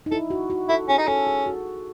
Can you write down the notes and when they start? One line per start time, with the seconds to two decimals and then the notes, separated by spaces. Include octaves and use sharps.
0.06 D#4
0.11 E4 A4
0.30 F#4
0.50 F#4
0.69 E4 A4
0.88 C#4 G#4
0.98 D#4
1.07 C#4 A4
1.27 G#4
1.46 F#4